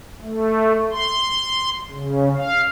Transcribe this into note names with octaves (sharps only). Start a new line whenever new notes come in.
A3
C6
C#3
F5